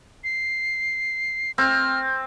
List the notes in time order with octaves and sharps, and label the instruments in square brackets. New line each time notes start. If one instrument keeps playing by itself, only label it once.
[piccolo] C7
[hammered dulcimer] C4 [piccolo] F6